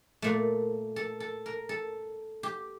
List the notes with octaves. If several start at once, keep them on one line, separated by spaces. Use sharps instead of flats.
A#2 A3
A4
A4
A#4
A4
G4